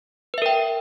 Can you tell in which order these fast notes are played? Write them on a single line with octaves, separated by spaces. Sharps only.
B4 E5 A#4 G5